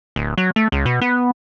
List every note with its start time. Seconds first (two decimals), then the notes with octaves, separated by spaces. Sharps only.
0.16 D1
0.38 F#3
0.56 A3
0.72 C#2
0.86 B2
1.01 B3